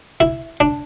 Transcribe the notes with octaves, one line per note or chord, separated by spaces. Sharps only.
E4
D4